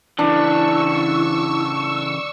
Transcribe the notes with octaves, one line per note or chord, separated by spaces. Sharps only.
C#3 E3 D4 E4 C#6 E6